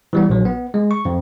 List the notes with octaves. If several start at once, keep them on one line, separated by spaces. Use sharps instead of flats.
E3 G3 B3
A#1 F#3
B3
G#3
C#6
F2